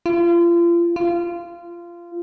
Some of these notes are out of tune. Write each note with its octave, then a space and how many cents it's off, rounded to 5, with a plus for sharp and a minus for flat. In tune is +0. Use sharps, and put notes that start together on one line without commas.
F4 -35
F4 -20